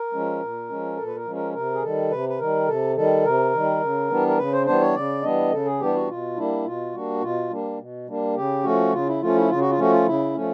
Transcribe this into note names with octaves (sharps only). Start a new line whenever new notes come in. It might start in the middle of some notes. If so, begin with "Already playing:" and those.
Already playing: A#4
F3 G#3 C#4
A#2
F3 G#3 C#4
A#2 A4
B4
A#4
F3 G#3 C#4
A#4
C3 A#4
G#4
D#3 G3 A4
C3 B4
B4
D#3 G3 A#4
C3 A4
D#3 G3 A4
C3 A#4
D#3 G3
C#3
E3 G3 B3 D4
A#4
C#3 B4
C5
E3 G3 B3 D4 C5
C#5
C#3 D5
E3 G3 B3 D4 D#5
C#3 A4
G#4
E3 G3 B3 D4 G4
F#4
B2 F4
G3 A#3 D4 E4
B2 F4
G3 A#3 D4 F#4
B2 F4
G3 A#3 D4
B2
G3 A#3 D4
C#3 G4
F3 A3 C#4 F#4
C#3 F4
E4
F3 A3 C#4 F4
E4
C#3 F4
F#4
F4
F3 A3 C#4 F#4
F4
C#3 E4
F3 A3 C#4